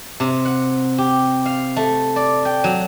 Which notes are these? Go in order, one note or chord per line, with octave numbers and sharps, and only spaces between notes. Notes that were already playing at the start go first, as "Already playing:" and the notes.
C3
F#5
G4
F5
A3
D5
G5
F#3